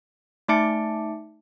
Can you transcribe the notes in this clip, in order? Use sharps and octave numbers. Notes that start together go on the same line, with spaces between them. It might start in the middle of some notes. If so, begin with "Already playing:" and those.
A3 D#4 E5 A5 D6 C#7